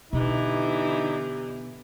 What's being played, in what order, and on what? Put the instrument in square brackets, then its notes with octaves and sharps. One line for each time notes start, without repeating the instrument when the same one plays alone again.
[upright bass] B2 [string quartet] D3 E3 [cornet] D#4 [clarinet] G4